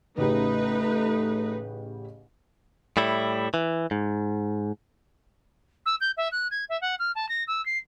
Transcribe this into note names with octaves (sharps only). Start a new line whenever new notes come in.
A1 C#3 A3 D#4 G4 B4
A2 G3 E4
E3
G#2
E6
G6
E5
F#6
G#6
E5
F#5
F6
A5
A#6
E6
C7